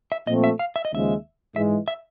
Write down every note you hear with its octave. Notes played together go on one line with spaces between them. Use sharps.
E5
A#2 F3 A3 C4 D#5
E5
F5
E5
D#5
D#2 C#3 F3 G#3 E5
G#2 E3 G#3 E5
E5